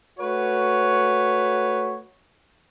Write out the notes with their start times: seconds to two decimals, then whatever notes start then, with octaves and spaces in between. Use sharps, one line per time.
0.19 A3 F#4 B4 C#5